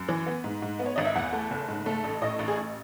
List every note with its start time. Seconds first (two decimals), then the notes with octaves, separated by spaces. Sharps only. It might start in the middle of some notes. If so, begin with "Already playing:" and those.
Already playing: F#2
0.09 E3
0.26 B3
0.44 G#2
0.62 G#2
0.79 B3
0.86 C#5
0.96 G#1 D#5
1.05 E5
1.15 E2 F#5
1.32 A3
1.51 F#1
1.68 G#2
1.86 A3
2.04 A1
2.21 A2 D#5
2.39 A1
2.48 G#4
2.57 A1